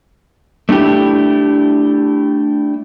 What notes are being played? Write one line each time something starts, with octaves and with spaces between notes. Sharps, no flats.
A3 D4 E4 G4